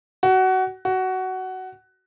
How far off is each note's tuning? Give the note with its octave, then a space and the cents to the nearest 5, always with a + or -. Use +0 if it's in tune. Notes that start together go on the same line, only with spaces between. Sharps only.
F#4 +20
F#4 +15